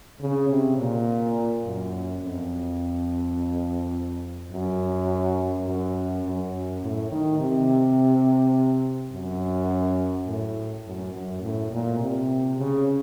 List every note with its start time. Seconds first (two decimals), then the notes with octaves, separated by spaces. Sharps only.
0.21 C#3
0.50 C3
0.78 A#2
1.64 F#2
2.22 F2
4.52 F#2
5.67 F#2
6.24 F#2
6.82 A2
7.11 D#3
7.40 C3
9.12 F#2
10.27 A2
10.85 F#2
11.13 F#2
11.42 A2
11.71 A#2
12.00 C3
12.57 C#3